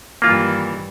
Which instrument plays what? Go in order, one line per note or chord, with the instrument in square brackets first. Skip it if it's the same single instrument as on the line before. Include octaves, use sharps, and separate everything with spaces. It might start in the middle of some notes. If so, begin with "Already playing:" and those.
[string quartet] G2 D#3 E3 [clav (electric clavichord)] A#3 F4